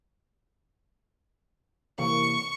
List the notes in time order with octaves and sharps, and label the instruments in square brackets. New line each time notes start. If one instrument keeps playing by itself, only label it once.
[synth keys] C3 E3 A#3 [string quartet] C#6